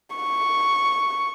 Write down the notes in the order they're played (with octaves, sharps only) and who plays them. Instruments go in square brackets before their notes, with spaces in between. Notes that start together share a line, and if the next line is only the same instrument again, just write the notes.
[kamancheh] C#6